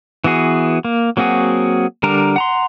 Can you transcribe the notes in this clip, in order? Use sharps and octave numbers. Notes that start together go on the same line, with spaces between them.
E3 B3 F#4 G#4
A#3
F#3 A#3 C4 F#4 G#4
D3 G3 D4 A#4 A#5
F#5 A#5 C6